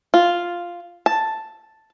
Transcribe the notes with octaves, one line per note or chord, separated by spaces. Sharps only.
F4
A5